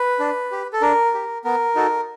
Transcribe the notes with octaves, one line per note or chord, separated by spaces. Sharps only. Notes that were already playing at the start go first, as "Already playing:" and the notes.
Already playing: B4
D4
G4
A4
D4 A#4
G4
B3 A#4
D#4 F#4 A4